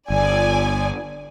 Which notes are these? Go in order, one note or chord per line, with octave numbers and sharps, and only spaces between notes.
G1 D5 G#5